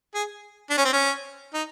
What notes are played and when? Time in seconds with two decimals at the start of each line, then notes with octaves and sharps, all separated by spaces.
0.14 G#4
0.70 D4
0.78 C#4
0.85 C4
0.93 C#4
1.54 D#4